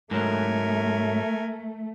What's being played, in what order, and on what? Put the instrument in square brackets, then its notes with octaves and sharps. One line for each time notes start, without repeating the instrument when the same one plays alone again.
[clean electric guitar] G#2 F#3 [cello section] A3 [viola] A#4 G#5